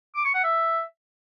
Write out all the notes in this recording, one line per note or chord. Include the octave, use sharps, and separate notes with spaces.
D6
C#6
F#5
E5